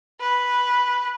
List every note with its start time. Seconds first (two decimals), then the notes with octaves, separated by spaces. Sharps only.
0.20 B4